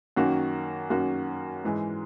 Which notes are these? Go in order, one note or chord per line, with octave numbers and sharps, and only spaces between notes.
F#2 D#3 A#3 C#4 F#4
F#2 D#3 A#3 C#4 F#4
G#2 E3 G#3